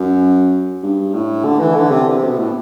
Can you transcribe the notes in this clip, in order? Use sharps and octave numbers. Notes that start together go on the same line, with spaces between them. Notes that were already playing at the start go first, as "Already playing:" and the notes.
Already playing: F#2
G2
A2
D3
E3
D3
C3
C3
B2
A2